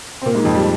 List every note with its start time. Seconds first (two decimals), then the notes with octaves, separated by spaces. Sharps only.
0.22 C4
0.26 A#2 A#3
0.35 G#2 G#3
0.44 F2 F3
0.55 G3